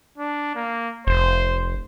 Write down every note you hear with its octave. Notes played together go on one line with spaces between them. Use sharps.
D4
A#3
F1 C5